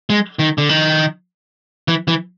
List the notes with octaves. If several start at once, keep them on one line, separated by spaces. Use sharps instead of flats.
G#3
D#3
D3
D#3
E3
E3